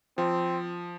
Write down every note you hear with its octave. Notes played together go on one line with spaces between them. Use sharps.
F3 C4